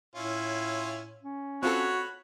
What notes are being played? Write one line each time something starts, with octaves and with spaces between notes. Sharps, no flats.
A2 C#4 E4 F4
C#4
C4 F4 F#4 A4 C#5 B5